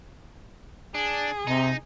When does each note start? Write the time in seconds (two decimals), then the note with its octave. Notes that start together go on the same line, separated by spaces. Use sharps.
0.95 D4 G#4
1.47 C3 D#4